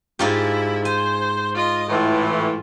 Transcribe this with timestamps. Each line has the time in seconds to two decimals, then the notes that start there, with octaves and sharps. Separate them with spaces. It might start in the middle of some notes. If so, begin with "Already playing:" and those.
0.19 G#2 E4 F4 G4
0.85 C5 G#5
1.55 F4 D#5
1.89 A2 E3 F4